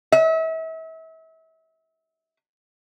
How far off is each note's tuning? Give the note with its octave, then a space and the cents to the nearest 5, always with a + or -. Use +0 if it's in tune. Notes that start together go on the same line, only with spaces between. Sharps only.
E5 -35